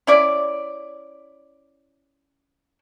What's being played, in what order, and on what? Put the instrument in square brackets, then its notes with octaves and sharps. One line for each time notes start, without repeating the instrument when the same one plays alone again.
[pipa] C#4 E4 D5